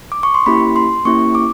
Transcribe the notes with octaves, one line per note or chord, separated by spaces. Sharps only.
D6
C#6
C6
A#3 C#4 E4 G4 B5
C6
A#3 C#4 E4 G4 C#6
D6